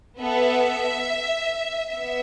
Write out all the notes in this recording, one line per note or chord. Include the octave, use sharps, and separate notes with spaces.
B3 A4 E5
B3 E5